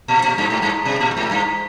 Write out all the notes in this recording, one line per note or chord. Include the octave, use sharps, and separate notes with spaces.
A#2
A#2
G2
G#2
G2
B2
A#2
G#2
G2